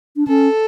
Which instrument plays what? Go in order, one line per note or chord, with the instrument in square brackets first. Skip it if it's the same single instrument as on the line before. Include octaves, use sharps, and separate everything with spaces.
[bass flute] D4
[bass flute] C#4 [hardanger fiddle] A4